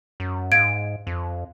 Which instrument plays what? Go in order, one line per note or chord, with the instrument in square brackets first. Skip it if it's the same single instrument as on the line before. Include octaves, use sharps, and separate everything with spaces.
[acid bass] F#2
[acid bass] G#2 [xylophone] F5 G#6 D7
[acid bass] F2